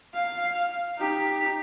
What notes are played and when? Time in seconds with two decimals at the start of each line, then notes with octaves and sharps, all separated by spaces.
0.13 F5
0.98 D#4 G4